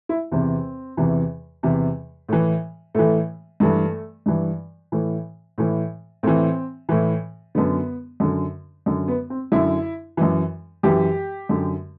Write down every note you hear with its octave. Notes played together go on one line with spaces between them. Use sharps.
E4
E2 C3 E3 C4
E2 C3 E3
E2 C3 E3
A2 E3
A2 E3 A3
G2 E3 A3
G2 E3
A2 E3
A2 E3
A2 E3 C4
A2 E3
F#2 D3 B3
F#2 D3
F#2 D3
B3
C4
F#2 D3 E4
F#2 E3
F#2 E3 G4
F#2 D3